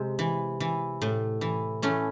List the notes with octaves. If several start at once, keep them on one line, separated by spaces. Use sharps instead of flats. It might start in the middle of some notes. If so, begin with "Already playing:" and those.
Already playing: C3 G#3 C4
E3
E3
A2
E3
E3 A3 C#4